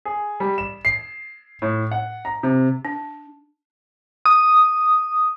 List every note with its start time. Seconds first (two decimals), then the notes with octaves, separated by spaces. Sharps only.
0.05 G#4
0.40 G3
0.58 E7
0.85 C7
1.62 A2
1.91 F#5
2.25 A#5
2.43 C3
2.85 D4
4.26 D#6